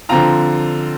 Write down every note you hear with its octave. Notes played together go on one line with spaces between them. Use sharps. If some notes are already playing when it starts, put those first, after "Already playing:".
D3 F3 C4 F4 A#5